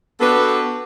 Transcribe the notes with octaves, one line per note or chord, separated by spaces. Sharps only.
B3 D4 F#4 G4 A4 B4